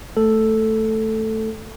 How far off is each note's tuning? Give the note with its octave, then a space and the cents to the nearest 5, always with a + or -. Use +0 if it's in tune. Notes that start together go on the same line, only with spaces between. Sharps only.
A3 +0 A4 +0